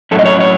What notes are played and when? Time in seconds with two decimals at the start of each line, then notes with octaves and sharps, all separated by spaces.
0.11 A2 F#3 C#4 E4 A4
0.19 D#5
0.25 C#5
0.40 C#5